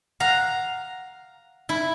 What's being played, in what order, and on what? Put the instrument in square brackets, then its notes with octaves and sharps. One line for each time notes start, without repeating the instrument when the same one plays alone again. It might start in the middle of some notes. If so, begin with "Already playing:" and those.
[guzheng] F5 A#5 [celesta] F#5 F#6
[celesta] D#4 [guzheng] E4